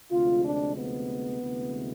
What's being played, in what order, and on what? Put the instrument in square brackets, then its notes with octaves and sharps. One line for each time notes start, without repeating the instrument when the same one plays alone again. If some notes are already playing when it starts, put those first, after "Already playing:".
[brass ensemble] D2 C3 F3 G#3 F4
D4
B3
D2 C3 E3 G#3